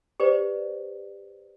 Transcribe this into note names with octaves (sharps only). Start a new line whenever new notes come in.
G4 B4 C5 D5